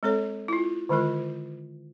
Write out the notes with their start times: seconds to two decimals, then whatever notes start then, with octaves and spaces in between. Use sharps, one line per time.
0.03 G#3 C4 A4 C#5
0.48 E4 F4
0.89 D3 D#3 G#3 F4 A#4